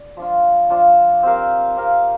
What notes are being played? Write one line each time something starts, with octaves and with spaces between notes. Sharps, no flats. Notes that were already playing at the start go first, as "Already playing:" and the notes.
Already playing: D5
F3 D4 F4
F3 D4 F4
C4 G4 A#4 F5
C4 G4 A#4 F5